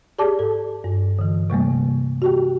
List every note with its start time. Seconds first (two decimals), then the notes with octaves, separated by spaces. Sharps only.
0.19 G4 G#4 D5 A5 D6
0.39 G#2 A4
0.84 G2
1.19 D3 E3
1.50 C3 G3 A3 A#3
2.22 F#4 G4 G5